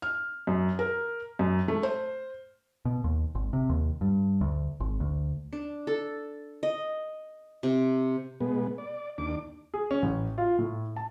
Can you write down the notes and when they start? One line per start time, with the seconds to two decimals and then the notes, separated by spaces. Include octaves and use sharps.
0.02 F6
0.47 F#2
0.79 A#4
1.39 F#2
1.68 A3
1.83 C5
2.85 B2
3.04 D#2
3.35 G#1
3.53 C3
3.70 D#2
4.01 G2
4.41 D2
4.80 G#1
5.00 D2
5.53 D4
5.87 A4
6.63 D#5
7.63 C3
8.41 B2 G#3 B3
8.78 D5
9.18 D#2 D4 D6
9.74 G#4
9.91 C#4
10.02 A1
10.38 F4
10.58 A2
10.96 A5